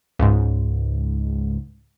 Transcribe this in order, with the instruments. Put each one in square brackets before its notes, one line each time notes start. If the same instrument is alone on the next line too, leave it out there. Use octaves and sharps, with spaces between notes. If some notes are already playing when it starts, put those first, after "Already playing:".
[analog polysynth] C#2 G#2